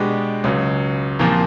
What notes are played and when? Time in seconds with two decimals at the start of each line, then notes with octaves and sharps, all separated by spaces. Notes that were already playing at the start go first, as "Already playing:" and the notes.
Already playing: B2 G#3 B3 D4 G4
0.44 C#2 C#3 F#3
1.19 C2 A#2 F3 A#3